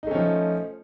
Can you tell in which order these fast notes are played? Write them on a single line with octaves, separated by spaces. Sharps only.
D#4 A3 C#4 F3